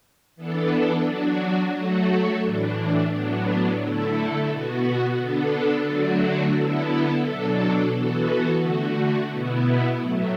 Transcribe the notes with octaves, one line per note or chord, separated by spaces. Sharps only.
E3 B3 D4 A4
F#3 D4 F#4
F#3 A3 F#4 A4
A2 E3 D4
A2 F#3 B3 D4
D3 A3 E4 A4
B2 B3 F#4
D3 B3 D4 A4
D3 F#3 A3 D4 F#4
D3 B3 E4 A4
B2 F#3 D4 A4
E3 B3 F#4 A4
D3 A3 F#4
B2 B3 E4
A2 F#3 A3